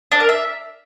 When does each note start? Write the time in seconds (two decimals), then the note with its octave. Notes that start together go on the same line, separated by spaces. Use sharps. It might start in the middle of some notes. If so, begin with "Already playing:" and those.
0.12 D4
0.20 A#4
0.29 E5